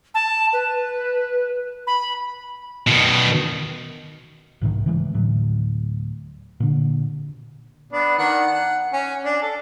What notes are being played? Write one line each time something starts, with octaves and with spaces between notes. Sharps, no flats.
A5
B4
B5
B2 D#3
B1 G#2 C3 D#3
C#3 E3 G#3
D2 A2 F#3
A#2 D3
B3 D4
D#3 D4 F#5
F#5
C#4
D4
A4